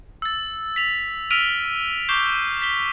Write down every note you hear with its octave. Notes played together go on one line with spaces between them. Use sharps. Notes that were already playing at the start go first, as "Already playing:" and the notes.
E6 A6
B6 F7
E6 F6 B6 D7 D#7 F7
C#6 D6 G6 C7 G7
B6 G7